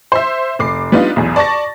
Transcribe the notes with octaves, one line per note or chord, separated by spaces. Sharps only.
C5 E5
F1 D6 C7
G3 B3 D4 D#4 F4
B1 E2
D5 A5 C#6 A6 A#6